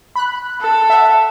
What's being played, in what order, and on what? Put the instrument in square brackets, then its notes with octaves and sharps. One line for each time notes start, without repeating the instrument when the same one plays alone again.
[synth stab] B5 F#6
[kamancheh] A4
[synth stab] E5 F#5